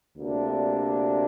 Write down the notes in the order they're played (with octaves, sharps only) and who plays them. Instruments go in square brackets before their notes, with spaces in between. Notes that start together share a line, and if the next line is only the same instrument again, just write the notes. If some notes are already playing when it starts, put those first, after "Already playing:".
[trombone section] D2 C3 A#3 D4